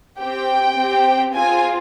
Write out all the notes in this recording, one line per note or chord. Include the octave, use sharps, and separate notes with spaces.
C4 G4 G5
C4 G4
C4 F4 G#4 G#5